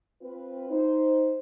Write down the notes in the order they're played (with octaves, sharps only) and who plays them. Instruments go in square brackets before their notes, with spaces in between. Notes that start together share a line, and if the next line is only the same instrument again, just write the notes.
[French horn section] C4 F4 B4
D#4 C5